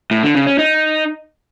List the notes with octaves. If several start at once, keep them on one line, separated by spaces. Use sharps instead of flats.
A2
D3
C#3
C#4
D#4